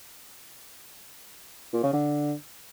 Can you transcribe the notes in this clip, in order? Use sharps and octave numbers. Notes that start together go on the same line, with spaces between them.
A#2
C#3
D3